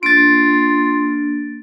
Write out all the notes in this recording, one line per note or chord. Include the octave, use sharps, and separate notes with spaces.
A#3 D4 F4 A6 D7